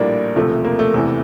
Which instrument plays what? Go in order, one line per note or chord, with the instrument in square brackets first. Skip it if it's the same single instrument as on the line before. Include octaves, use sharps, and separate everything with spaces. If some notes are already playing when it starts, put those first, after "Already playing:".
Already playing: [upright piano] A#1 A2 G3 A#3 D4
E1 D2 C3 F3 A3
A#3
A3
F1 E2 C3 E3